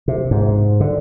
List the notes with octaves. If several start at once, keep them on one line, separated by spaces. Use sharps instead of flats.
C3
G#2
D3